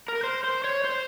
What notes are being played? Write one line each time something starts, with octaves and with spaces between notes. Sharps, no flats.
A#4
C5
C5
C#5
C5